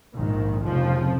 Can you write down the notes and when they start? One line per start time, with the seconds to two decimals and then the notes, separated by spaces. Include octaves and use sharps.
0.15 A#1 G#2 D#3
0.63 F1 F2 C#3 F3